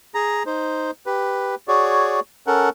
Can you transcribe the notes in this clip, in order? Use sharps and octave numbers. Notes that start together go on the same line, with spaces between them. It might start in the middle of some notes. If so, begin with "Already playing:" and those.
G#4 A#5
D#4 C5
G4 B4
F#4 G#4 C#5 D5
C#4 A4 A#4 F#5